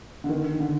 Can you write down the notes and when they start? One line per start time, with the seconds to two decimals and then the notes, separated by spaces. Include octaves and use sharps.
0.24 D3
0.29 D#3
0.60 D3